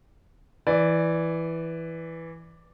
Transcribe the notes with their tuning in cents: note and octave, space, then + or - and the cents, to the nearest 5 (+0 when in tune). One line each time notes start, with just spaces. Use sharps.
E3 +0 D5 +0